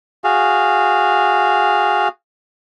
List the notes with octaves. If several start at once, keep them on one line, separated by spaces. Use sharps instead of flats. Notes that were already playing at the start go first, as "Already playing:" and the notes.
F#4 G#4 F5